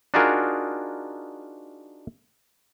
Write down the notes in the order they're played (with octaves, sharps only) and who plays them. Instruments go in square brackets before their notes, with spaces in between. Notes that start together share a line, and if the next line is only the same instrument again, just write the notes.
[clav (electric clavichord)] D4 D#4 F4 F#4 G#4 A#4